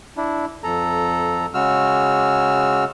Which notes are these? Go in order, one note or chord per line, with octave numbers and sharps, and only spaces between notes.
D4 E4
F2 A4 A#5
C#3 G#3 F#4 E6 F6